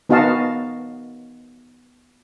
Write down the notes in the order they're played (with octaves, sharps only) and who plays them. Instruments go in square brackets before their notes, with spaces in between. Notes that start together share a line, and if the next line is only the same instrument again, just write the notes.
[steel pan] B3 D#4 F#4 D#5 F5 A5